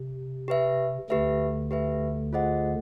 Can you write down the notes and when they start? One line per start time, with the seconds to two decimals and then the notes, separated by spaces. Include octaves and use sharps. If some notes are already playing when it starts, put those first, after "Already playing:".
Already playing: C3
0.48 G4 B4 E5
1.10 D2 D3 G4 B4 E5
1.71 G4 B4 E5
2.33 F4 G#4 C5 D#5 F#5